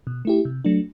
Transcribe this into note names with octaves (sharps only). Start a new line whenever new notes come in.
B2
A3 E4 G4
C3
F#3 A3 D4